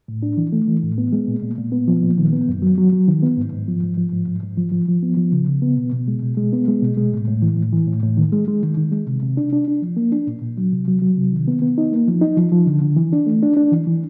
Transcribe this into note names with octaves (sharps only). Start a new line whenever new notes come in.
A2
D4
E3
A3
E3
A2
B3
G#3
A#2
A#2
A#2
B3
F3
A#2
D#3
B3
F#2
F#3
F#3
F#3
D#3
B3
G#2
G#2
F3
G#2
F3
G#2
G#2
G#2
F3
F3
F3
B3
F3
C#3
C#3
B3
B2
B2
G#3
B2
G#3
B3
G#3
B2
G#3
A2
A2
E3
A2
E3
A2
A2
D#3
G#3
G#3
D#3
D#3
G#3
C3
C3
D4
D4
D4
F3
A#3
D4
A#2
A#2
F#3
C3
F#3
F#3
C3
D#3
B3
B3
D#4
A#3
F3
D#4
F3
F3
D3
D3
E3
D4
A3
D4
D4
E3
E3